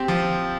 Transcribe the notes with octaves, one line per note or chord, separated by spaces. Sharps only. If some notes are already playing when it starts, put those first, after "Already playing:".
Already playing: C4 G4
F3